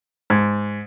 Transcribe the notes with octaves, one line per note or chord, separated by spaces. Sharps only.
G#2